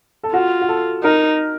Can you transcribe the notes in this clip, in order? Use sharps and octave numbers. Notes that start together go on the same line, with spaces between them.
A4
F4 F#4
F#4
A4
D#4 A#4